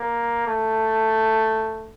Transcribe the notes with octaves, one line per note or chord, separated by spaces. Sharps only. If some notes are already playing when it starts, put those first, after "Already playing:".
Already playing: A#3
A3